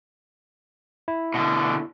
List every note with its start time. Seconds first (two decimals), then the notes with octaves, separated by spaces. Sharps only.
1.08 E4
1.34 B2 D3